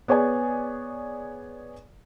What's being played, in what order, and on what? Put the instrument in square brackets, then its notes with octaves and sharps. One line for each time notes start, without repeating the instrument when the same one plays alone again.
[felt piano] B3 G#4 C#5 D5 G#5